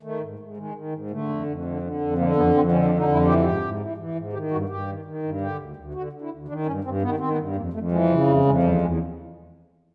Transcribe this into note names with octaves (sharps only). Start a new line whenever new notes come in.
D#3 A3
G#2
G#2
D#3 G#3
D#3
G#2
D3 A3
F2
F2
D3
D3
F2
D3 A#3
F2 B3
F2 C4
D3 C#4
D4
D3
D#4
F2 E4
E3 G4
G#2 G4
G#2
E3
E3
G#2
D#3 G4
G2 F#4
G2 G4
D#3
D#3
G2
D3 G4
D2
D2
D3 F#4
D3
E4
D2
D#3 D4
G2 C#4
G2 C4
D#3 B3
D#3 C4
B3
G2
F2 A#3
F2 A3
E3 G#3
C#3 G3
F2 G3
F2 G#3
E2 G3
E2 G#3